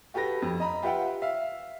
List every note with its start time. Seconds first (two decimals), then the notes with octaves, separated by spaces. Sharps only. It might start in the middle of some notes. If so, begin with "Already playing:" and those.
0.14 F#4 G4 A4 B4 A#6
0.42 F2
0.60 D#5 A#5 B5
0.82 F4 G4 B4 E5 F#5 G5
1.22 E5 F5